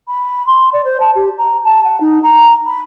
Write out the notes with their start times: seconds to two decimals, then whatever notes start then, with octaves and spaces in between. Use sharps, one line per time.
0.08 B5
0.46 C6
0.73 D5
0.85 C5
1.00 A5
1.15 G4
1.38 A#5
1.64 A5
1.84 F#5
2.00 D#4
2.23 A#5
2.66 B5